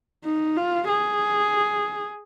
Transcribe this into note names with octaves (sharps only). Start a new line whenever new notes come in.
D#4
F4
G#4